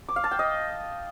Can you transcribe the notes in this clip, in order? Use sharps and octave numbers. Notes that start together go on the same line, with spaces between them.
D6
F5
A5
G5
D#5